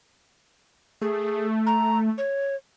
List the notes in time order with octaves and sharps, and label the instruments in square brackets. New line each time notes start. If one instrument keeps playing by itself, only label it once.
[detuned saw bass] A3 [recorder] G#4
[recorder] A#5
C#5